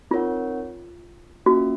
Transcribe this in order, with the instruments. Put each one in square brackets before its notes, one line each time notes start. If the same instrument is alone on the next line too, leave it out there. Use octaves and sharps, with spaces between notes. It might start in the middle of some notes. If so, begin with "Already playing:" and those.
[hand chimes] C4 D#4 A#4 C#5 F#5 [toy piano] F4
[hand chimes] A#3 C#4 F4 [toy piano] F#4